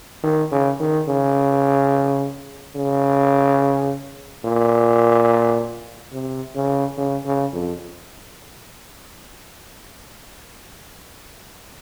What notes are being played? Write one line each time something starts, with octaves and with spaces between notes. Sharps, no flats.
D#3
C#3
D#3
C#3
C#3
A#2
C3
C#3
C#3
C#3
F2